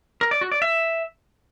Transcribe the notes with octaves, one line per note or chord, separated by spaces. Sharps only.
A#4
D5
F#4
D5
E5